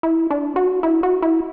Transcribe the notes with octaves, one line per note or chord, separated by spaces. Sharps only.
E4
D4
F#4
E4
F#4
E4